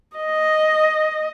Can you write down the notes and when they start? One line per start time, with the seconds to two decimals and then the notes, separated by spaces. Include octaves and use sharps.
0.17 D#5